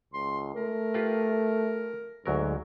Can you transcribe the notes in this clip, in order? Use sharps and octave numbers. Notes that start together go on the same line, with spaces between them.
C#2 C6
A3 A#4
F4 G4 B4
D2 G#2 F#3 A#4